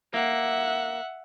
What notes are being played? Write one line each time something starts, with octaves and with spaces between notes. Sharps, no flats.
A#3 E5 F#5